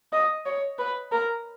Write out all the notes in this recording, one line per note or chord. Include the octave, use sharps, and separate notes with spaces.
D#5
C#5
B4
A#4